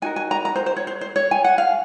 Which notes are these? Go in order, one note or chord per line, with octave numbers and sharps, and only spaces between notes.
D#4 F#4 A#4 G#5
G#5
A#5
A#5
C5
C5
C#5
C5
C5
C#5
G#5
F#5
F5